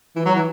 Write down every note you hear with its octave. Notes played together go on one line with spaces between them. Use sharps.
E3
F#3
E3